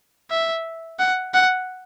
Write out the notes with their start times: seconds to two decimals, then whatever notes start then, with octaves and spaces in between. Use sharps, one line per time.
0.31 E5
0.99 F#5
1.34 F#5